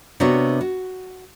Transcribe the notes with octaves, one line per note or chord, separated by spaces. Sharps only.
C3 B3 D4 F#4 C#5
F#4